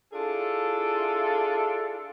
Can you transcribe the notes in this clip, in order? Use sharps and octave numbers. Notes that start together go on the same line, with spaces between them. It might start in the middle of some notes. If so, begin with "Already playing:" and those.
D4 E4 F4 G#4 A4